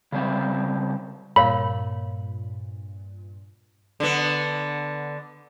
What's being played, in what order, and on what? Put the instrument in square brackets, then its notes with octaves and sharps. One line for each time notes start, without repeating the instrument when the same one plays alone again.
[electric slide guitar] C#3 G3 C4
[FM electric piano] G2 A#2 [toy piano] A#4 C#5 F5 [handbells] B5
[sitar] D3 B3